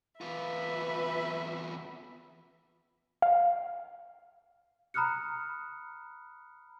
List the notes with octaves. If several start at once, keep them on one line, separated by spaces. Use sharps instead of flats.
E2 F4 B4 E5
F5
A#5 B5 D#6 F6 F#6 C#7